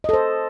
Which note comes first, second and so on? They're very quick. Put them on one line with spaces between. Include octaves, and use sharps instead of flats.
D#5 A4 C5